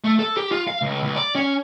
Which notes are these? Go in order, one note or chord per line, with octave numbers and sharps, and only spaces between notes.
A3
A4
G4
F4
F5
C#2
C#2
D5
C#4